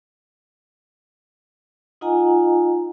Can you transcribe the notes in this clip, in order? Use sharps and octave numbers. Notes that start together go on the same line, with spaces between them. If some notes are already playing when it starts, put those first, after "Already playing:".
D#4 F4 D#5 F#5 G#5 A#5